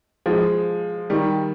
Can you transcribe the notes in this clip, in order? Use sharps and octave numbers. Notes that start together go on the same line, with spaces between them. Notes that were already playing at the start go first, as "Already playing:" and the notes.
F3 G#3
D#3 G3